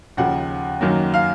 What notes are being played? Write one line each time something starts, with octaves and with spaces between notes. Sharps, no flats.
D#2 C#3 F3 F#5
F#2 D#3 F#3 A#3
F5